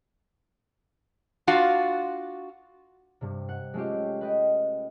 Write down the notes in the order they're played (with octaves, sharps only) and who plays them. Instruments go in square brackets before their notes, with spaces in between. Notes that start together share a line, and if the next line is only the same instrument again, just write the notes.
[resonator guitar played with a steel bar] D4 F4 F#4 F5
[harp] G2 C3
F#5
G#3 A3 C#4 F4 G4
B4 D#5 G5